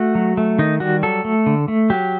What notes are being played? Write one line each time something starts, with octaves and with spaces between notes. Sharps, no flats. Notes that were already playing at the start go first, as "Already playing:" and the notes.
Already playing: A3 F#4
F#3
A3
D#3 D#4
G3 F#4
F#3 A4
A3
D3
A3
F#3 G4